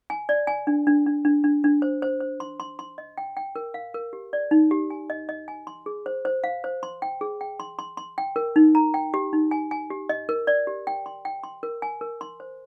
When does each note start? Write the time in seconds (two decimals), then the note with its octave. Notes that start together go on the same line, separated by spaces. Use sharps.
0.10 G#5
0.29 D5
0.47 G#5
0.67 D4
0.87 D4
1.06 D4
1.25 D4
1.44 D4
1.64 D4
1.82 C5
2.02 C5
2.20 C5
2.40 C6
2.60 C6
2.79 C6
2.98 D#5
3.18 G5
3.37 G5
3.56 A#4
3.74 F5
3.94 A#4
4.13 G4
4.33 D5
4.51 D#4
4.71 G4
4.90 G#5
5.10 D#5
5.29 D#5
5.48 G#5
5.67 C6
5.86 G#4
6.06 C5
6.25 C5
6.44 F5
6.64 C5
6.83 C6
7.02 G5
7.21 G#4
7.41 G5
7.60 C6
7.79 C6
7.97 C6
8.18 G5
8.36 A#4
8.56 D#4
8.75 A#5
8.94 G5
9.14 G4
9.33 D#4
9.51 G#5
9.71 G#5
9.90 G4
10.09 D#5
10.29 A#4
10.47 D5
10.67 G4
10.87 G5
11.06 C6
11.25 G5
11.44 C6
11.63 A#4
11.82 G#5
12.01 A#4
12.21 C6
12.40 C5